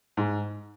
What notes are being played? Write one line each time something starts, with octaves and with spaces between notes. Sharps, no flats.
G#2